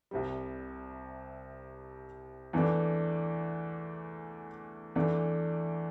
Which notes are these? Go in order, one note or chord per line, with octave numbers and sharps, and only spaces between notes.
C2 C3 G3
E2 E3 A3 D4
E2 E3 A3 D4